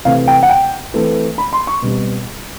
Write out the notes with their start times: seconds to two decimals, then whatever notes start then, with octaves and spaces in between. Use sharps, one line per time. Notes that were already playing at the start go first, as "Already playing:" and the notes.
0.05 C3 E3 A3 C4 F5
0.28 G5
0.43 F#5
0.49 G5
0.94 E3 A3 C4
1.38 B5
1.53 C6
1.67 C#6
1.82 B2 G3 C4